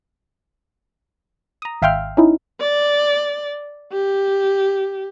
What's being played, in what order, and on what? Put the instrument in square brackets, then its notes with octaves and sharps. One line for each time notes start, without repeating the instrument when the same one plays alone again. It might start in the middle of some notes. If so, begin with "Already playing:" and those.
[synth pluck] A#5 D#6
G#1 E5 F5 G5 C6 F6
C#4 D#4 E4
[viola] D5
G4